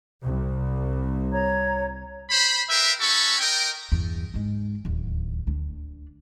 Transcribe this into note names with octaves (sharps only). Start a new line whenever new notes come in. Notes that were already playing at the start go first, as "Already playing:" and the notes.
C2
C#5 A#5 G#6
C5 B5
A#4 B4 E5 F5 G5
C#4 F#4 A4 B5 C#6
A#4 D#5 G5
E2 G2
G#2 G#3
D1 D#2
D2 D4